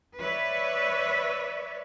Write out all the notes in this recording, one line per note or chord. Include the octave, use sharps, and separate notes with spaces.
B4 C#5 D5 E5